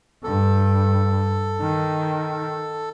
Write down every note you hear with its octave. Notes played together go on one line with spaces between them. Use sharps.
G2 A4
D#3